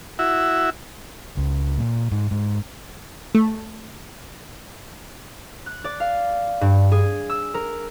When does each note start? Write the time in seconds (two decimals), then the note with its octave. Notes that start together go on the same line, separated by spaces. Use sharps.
0.19 E4 F#4 E5
1.37 C#2
1.78 A#2
2.11 G#2
2.31 G#2
3.35 A3
5.66 F#6
5.84 D5
6.00 F5
6.61 G2
6.92 G#4
7.30 E6
7.54 A#4